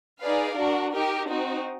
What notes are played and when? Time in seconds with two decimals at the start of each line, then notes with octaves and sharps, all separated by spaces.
0.20 D#4 G#4 B4 D5 F5
0.56 D4 F#4 A#4
0.92 D#4 G4 A#4
1.29 C4 D#4 F#4